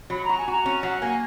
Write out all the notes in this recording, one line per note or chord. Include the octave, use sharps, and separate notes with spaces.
F#3 B5
F#4 A#5
G#5
F#4 A#5
C#4
F#3 F#5
A#3 G#5